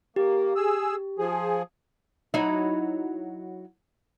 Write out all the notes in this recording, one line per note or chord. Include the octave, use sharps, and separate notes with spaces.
A#3 G4
G#4 E6
F3 G#4
F#3 D#4 E4